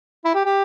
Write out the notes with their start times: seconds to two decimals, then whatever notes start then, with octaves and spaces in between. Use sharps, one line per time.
0.25 E4
0.34 G4
0.45 G4